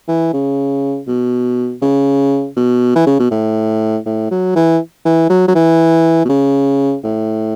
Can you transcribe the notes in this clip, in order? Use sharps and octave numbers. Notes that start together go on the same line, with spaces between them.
E3
C#3
B2
C#3
B2
E3
C#3
B2
A2
A2
F#3
E3
E3
F#3
F#3
E3
B2
C#3
A2